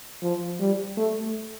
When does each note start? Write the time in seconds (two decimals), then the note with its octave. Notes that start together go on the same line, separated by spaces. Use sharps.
0.22 F3
0.60 G3
0.97 A3